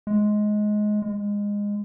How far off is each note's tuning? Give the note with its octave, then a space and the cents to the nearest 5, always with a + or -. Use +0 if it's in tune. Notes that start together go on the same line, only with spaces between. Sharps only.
G#3 +15
G#3 -20